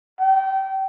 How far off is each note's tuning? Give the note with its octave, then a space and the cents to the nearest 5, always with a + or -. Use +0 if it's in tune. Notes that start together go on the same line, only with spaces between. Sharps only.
G5 -30